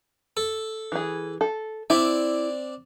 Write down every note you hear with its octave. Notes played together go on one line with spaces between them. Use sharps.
A4
E3 G#4
A4
C4 D4 E4 D5